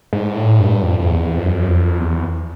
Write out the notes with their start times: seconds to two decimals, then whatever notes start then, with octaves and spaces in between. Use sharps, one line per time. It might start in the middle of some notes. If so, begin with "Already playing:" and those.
0.13 G#2
0.36 A2
0.59 G2
0.82 F2
0.99 F2
1.06 E2
1.37 F2
1.44 F#2
1.52 F2
1.62 F#2
1.68 F2
1.99 E2